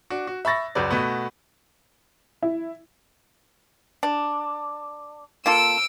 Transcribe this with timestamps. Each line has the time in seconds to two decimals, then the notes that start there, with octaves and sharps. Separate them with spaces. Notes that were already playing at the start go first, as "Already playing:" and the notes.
0.10 D4 F#4
0.27 F#4
0.45 E5 B5 C#6 A6 A#6
0.75 C#2 F#2 C#3 B4 D5
0.90 B2 A3 B3
2.43 E4
4.03 D4
5.46 A#3 F4 A4 E6 D7